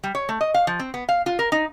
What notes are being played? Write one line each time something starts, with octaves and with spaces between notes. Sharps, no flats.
G3
C#5
A3
D#5
F5
F3
C4
B3
F5
F4
A#4
D#4